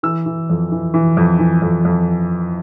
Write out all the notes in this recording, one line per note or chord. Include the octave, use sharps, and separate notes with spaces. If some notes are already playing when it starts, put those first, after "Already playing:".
E3 E6
E3
F2
E3
E3
F2
E3
F2
F2